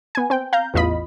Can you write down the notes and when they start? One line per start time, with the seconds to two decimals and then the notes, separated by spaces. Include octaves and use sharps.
0.15 B3 G#5
0.30 C4 G5
0.53 F5 A#5 G6
0.74 A1 E2 F4 D#5 B5